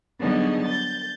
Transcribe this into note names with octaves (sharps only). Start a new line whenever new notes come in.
D3 F#3 G3 B3 D#4 G#4
G6 A6